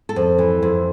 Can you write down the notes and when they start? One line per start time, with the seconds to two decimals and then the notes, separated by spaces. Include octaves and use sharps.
0.09 A4
0.16 F2
0.38 E3
0.62 F2